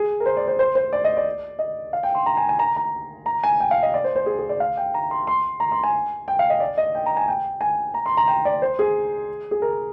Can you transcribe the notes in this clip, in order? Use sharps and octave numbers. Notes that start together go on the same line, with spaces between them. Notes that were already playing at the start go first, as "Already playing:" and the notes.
Already playing: G#4
A#4
C5
D5
C5
C5
C5
D5
D#5
D5
D#5
F5
G5
C6
A#5
G#5
G#5
A#5
A#5
A#5
G#5
G5
F5
D#5
D5
C5
C5
G#4
G#4
D5
F5
G5
A#5
C6
C6
A#5
C6
G#5
G5
F5
D#5
D5
D#5
G5
A#5
G#5
G5
G#5
A#5
C6
A#5
G5
D5
C5
G#4
G#4
A#4